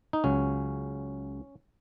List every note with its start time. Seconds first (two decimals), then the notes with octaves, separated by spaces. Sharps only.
0.13 D#4
0.24 C#2 C#3 F#3 C#4